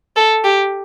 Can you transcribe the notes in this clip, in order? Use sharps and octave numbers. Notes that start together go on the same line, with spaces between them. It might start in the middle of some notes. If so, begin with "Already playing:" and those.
A4
G4